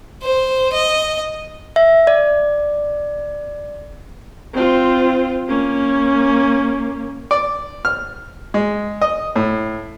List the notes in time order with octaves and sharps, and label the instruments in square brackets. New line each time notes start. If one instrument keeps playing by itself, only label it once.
[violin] C5
D#5
[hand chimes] E5
D5
[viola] C4 F4
A#3 C#4
[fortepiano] D5
F6
G#3
D#5
A2